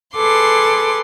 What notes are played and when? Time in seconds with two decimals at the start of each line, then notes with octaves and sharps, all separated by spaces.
0.15 G#4 A4 B4 C6 D6